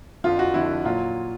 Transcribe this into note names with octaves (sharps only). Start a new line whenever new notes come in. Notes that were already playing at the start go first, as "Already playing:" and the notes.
F2 D3 F3 F4
F#4
F2 D3 F3 E4
A#2 F#3 F4